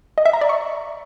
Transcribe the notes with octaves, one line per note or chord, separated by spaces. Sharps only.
D#5
E5
A#5
D5
C#6